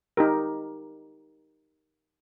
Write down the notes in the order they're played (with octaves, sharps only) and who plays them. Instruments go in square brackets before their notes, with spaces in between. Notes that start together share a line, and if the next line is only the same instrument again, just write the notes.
[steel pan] D#4 G4 A#4